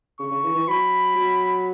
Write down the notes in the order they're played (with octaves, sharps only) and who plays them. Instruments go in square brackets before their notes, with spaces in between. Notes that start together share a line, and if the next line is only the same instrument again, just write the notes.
[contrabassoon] C#3 [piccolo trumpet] C#6
[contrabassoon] C#3
E3
E3
[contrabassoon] F#3 [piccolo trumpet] B5
[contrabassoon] F#3